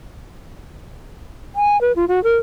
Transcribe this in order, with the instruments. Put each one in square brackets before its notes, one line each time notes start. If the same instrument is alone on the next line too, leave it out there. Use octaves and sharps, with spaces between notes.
[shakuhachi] G#5
B4
F4
F#4
A#4